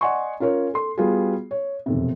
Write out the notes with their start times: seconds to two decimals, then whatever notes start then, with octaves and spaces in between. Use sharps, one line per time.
0.01 D5 D#5 F#5 G#5 C6 C#6
0.40 C#4 F4 A#4 C#5
0.74 A4 C6
0.98 G3 B3 F4 F#4 G#4
1.51 C#5
1.86 E1 F2 C3